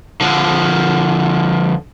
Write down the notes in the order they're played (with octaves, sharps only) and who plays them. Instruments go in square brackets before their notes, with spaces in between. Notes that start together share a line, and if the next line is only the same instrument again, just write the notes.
[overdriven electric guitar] D3 F3